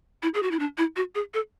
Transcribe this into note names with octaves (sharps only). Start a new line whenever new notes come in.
E4
G#4
F#4
E4
D4
E4
F#4
G#4
A4